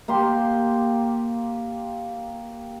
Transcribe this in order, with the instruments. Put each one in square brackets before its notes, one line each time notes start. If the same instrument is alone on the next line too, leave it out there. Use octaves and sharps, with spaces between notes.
[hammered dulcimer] A#3 G4 C6